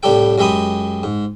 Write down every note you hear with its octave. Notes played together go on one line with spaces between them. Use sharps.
C2 A2 G3 G4 A4 G5
F#2 G#3 G4 E5 B5 D#6
G#2